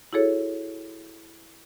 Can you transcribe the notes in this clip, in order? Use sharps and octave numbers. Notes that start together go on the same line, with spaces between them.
E4 F#4 G#4 A4 C#5